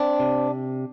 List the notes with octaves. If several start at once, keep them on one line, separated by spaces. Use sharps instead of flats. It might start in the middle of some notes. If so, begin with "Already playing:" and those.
Already playing: C4 D4
C3